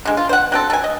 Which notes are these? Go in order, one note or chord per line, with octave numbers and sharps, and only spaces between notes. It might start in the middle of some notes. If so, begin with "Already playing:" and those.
D3 G#3
F4
C5 F#5
F#3 C4 A4
A4 G#5
D#5